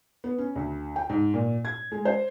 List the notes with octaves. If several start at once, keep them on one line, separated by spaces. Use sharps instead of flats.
B3
C#4
D2
G5
G#2
A#2
G#6
G#3
C5